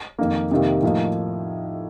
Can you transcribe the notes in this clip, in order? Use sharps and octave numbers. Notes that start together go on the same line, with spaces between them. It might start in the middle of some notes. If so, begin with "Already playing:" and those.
F2 D#3 A#3
F2 C3 D#3 A#3
A2 F3 A#3 D#4